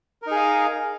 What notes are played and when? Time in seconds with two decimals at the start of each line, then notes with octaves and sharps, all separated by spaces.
0.22 A#4
0.27 D#4
0.31 G#4
0.36 F5